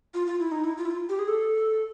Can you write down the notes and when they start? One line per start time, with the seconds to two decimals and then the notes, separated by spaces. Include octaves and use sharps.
0.14 F4
0.27 F4
0.40 E4
0.51 D#4
0.64 E4
0.78 F4
0.85 E4
0.91 F4
1.09 G4
1.19 G#4
1.28 A4